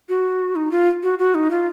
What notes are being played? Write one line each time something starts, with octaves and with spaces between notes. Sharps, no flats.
F#4
D#4
F4
F#4
F#4
D#4
F4